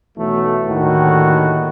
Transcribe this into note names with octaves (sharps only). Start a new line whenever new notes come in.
B1 E3 F#3 A3
D#2 A2 D3 D#3 F#4